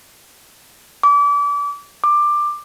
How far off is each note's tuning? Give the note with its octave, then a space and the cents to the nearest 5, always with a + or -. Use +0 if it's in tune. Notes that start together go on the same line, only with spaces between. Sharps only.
D6 -30
D6 +15